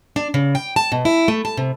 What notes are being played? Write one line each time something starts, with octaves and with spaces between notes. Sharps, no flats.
D4
C#3
G5
A5
B2
E4
A3
A5
C3